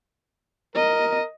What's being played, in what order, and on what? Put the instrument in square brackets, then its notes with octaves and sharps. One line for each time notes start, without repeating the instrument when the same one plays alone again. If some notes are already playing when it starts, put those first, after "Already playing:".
[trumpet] A#4 [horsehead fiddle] D#5